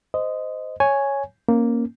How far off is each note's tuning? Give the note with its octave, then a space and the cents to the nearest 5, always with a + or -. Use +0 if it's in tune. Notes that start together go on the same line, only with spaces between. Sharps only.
C5 -20 D#5 +0
C#5 +0 G#5 +0
A#3 +0 C#4 -20